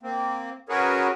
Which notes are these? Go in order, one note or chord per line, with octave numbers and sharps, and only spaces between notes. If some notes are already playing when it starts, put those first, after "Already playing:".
A#3 C4
C#4 F#4 G#4 A#4 B4 C#5